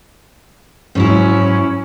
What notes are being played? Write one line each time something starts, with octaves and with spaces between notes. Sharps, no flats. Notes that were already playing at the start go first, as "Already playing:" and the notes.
G#2 F#3 C#4 E4